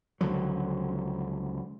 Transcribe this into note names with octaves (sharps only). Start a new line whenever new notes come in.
C#2 D3 F3 F#3